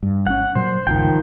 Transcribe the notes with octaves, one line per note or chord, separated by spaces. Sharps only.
G2
G#1 D#3 C#4 F#5
A#2 F#3 C5
G1 C#2 D#3 F3 G5